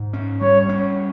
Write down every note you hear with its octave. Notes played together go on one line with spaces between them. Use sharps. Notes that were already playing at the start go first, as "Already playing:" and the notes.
Already playing: G#2
C#4
G3 C#5
C#4